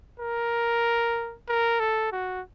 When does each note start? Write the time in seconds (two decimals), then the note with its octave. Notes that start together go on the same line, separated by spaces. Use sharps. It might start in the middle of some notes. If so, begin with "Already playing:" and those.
0.20 A#4
1.49 A#4
1.80 A4
2.12 F#4